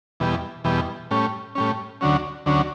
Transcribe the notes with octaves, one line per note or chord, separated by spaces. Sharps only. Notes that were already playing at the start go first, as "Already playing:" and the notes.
E2 B2 G3
E2 B2 G3
A2 G3 C#4
A2 G3 C#4
D2 D3 F#3 C#4
D2 D3 F#3 C#4